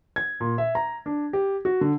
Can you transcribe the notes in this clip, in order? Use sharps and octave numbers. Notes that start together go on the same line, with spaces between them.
G#6
A#2
E5
A#5
D4
G4
F#4
D3